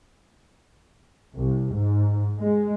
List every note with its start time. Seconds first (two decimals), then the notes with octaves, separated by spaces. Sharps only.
1.35 C2
1.76 G#2
2.40 G#3